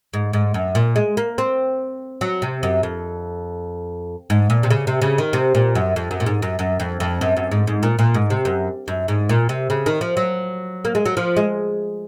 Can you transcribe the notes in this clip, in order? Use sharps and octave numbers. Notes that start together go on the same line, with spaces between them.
G#2
G#2
F#2
A#2
G#3
A#3
C4
F#3
C3
F#2
F2
G#2
A#2
C3
C#3
C3
C#3
D#3
C3
A#2
F#2
F2
F#2
A#2
G#2
F#2
F#2
F2
F2
F#2
F#2
G#2
G#2
A#2
A#2
G#2
C3
F#2
F#2
G#2
A#2
C3
C#3
D#3
F3
F#3
A#3
G#3
F#3
F3
G#3